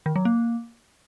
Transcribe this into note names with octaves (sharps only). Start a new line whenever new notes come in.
D#3
F#3
A#3